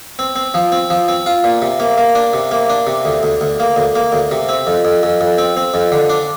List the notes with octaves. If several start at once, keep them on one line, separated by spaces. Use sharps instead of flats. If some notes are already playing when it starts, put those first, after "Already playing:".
C4
C4
F3
C4
F3
C4
F4
A#2
C3
A#3
A#3
D4
C3
A#3
D4
C3
D2
D2
D2
A#3
D2
A#3
D2
C3
C4
F2
F2
F2
F2
C4
C4
F2
D3
D4